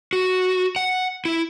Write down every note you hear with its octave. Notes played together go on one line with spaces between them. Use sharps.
F#4
F#5
E4